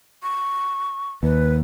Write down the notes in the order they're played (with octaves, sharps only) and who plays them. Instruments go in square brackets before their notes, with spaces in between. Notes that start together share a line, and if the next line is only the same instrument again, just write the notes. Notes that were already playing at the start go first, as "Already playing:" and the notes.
[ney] C#6
[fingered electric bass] D#2 [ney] B4